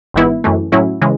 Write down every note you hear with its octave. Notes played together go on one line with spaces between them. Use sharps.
G#1 G#2 E3 B3 E4
F#2 E3 A3
A2 F#3 C#4 E4
C#3 E3 G#3